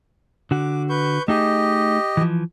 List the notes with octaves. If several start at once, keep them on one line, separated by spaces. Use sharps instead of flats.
D3 F#4 D6
B4 C#6 G6
A3 D#4 G4 G#4 D#5
E3 F3